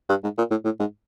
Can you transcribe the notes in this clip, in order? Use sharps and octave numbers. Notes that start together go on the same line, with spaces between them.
G2
G#2
A#2
A2
A2
G#2